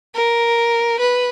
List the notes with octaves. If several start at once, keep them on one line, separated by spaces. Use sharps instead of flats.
A#4
B4